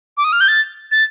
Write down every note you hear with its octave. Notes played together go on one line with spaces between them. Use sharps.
D6
D#6
F6
G6
A6
A6